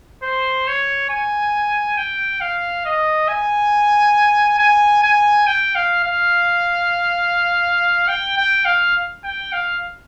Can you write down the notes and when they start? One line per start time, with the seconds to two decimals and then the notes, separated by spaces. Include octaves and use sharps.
0.23 C5
0.68 C#5
1.10 G#5
1.97 G5
2.41 F5
2.85 D#5
3.28 G#5
4.59 G#5
5.03 G#5
5.47 G5
5.75 F5
6.04 F5
8.08 G5
8.37 G5
8.65 F5
9.24 G5
9.52 F5